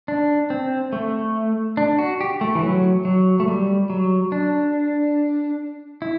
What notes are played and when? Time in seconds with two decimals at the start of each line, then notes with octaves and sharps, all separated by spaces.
0.08 D4
0.50 C4
0.93 A3
1.77 D4
1.98 F#4
2.21 G4
2.41 A3
2.55 E3
2.63 F#3
3.05 F#3
3.40 A3
3.48 G3
3.90 F#3
4.32 D4
6.02 E4